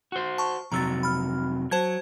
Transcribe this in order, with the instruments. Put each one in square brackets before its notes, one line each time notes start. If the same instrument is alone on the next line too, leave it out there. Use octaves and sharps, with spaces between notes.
[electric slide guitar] F#4 C5
[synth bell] A5 C#6
[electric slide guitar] F2 C3 F#3 [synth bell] A#5 E6 A6
[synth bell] B5 F6
[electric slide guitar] F#3 [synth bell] C5 A5 G#6